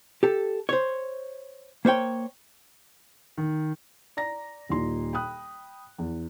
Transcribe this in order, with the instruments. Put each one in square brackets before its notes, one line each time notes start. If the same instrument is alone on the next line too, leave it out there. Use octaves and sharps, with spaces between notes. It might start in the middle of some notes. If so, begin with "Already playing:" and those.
[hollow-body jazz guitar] G4 A4
C5 C#5
A#3 C5 C#5 G5
[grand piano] D#3
[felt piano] D5 A#5 A#6
D#1 A#2 D#4 C6
G5 B5 D#6 F#6
E2